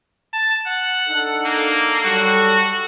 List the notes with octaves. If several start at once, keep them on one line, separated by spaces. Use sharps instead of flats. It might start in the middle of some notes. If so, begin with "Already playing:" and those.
A5
F#5
D4 D#4 A4
A#3
F#3 G3 F#4 A4